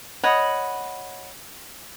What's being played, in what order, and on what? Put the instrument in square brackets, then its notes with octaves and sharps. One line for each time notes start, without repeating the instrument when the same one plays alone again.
[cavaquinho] C#5 D#5 F#5 B5